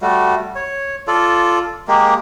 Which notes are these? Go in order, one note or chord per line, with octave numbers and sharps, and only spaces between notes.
G3 A3 F#4
C#5
F4 A4 D5
G#3 A#3 G4